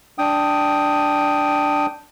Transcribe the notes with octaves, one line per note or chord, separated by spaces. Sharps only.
D4 G5 D#6